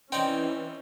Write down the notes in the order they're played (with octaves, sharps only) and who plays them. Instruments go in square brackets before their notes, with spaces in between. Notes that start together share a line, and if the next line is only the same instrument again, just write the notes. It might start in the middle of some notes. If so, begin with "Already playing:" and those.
[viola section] E3 C#4 [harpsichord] C4 D#4 D5 [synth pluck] G5